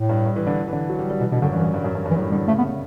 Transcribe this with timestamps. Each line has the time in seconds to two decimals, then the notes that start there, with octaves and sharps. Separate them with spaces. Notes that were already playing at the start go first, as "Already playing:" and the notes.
Already playing: A2
0.09 G2
0.26 G2
0.36 E3
0.47 D3
0.68 E3
0.73 D3
0.89 F#3
0.99 G3
1.10 G3
1.20 B2 E3
1.32 B2 D3
1.42 F#2 D3
1.53 G2 E3
1.63 G2
1.74 G2
1.84 F#2
1.95 G2
2.05 G2
2.11 E3
2.16 A2 F#3
2.32 D3 G3
2.47 C#3 A3
2.58 B3